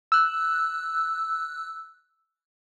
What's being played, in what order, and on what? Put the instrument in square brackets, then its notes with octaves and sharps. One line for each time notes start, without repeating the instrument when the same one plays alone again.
[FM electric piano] E6 F#6